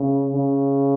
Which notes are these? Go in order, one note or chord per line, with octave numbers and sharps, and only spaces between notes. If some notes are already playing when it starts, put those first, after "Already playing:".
Already playing: C#3
C#3